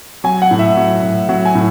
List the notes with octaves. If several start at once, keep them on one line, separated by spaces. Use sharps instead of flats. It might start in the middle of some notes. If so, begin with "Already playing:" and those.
F#3 G#5
F#5
A2
E5
F#3
A2
F#3 F#5
G#5
A2